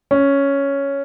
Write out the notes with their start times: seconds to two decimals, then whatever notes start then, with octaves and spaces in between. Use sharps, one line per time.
0.11 C#4